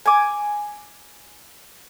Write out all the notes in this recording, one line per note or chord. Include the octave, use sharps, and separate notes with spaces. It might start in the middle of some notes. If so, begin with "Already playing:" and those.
G#5 D6